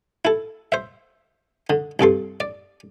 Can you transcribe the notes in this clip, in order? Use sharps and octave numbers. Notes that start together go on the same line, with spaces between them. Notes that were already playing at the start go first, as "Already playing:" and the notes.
E4 A4
C5 E5
D3
C2 G2 A4 C6
D5